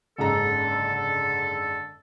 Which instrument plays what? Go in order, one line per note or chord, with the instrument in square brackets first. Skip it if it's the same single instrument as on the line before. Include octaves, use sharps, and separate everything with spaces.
[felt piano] F#1 G#2 A#5 [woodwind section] D3 A4